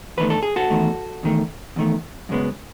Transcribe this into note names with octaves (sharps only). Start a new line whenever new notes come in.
E2 D#3 A3 B4
A4
G#4
F#4 A4
E2 D#3 A3
E2 D#3 A3
E2 D#3 A3
F#2 C#3 G#3 B3